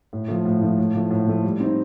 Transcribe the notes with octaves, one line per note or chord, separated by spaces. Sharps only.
A2
F3 A3
A2
F3 A3
A2
F3 A3
A2
F3 A3
G3
C4 D#4